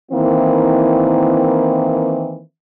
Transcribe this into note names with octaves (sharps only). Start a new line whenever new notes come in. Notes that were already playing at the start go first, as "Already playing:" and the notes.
D#3 E3 A#3 C4 E4